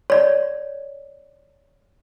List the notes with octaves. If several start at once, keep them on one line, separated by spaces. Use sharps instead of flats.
C#5 D5